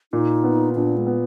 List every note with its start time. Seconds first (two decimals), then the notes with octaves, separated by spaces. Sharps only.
0.13 A#2 D#4
0.44 B3
0.75 A#2 D4
0.97 G#3
1.07 B3